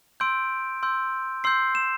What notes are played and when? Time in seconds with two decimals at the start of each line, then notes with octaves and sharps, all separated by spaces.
0.20 C6 E6 G6 D7
0.83 C6 E6 G6
1.44 C6 E6 G6 C7
1.75 E7